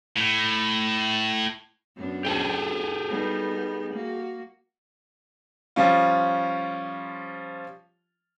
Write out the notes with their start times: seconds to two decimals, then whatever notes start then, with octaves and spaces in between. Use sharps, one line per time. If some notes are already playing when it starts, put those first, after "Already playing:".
0.16 A2
1.96 F#2 B3 D4
2.25 G4 G#4 A5
3.07 G3 B3 D#4
3.93 A#3 F#4
5.76 F3 G3 C#4 F4